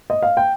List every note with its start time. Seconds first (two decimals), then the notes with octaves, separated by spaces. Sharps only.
0.10 D#5
0.23 F5
0.37 G5